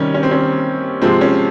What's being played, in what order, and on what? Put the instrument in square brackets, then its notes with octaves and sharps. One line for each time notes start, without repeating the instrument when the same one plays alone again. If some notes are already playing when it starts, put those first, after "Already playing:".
Already playing: [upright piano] C3 D#3 G3 C#4
C#4
C4
C#4
C3 F3 G#3 C4
C#4